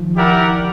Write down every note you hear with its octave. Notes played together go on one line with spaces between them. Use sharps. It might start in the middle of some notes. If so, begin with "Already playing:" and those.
Already playing: D#3 F3
E4 G4 A#4 D5 F#5